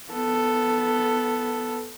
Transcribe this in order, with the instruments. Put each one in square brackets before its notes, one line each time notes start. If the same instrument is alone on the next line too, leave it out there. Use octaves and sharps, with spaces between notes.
[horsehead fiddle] B3 A4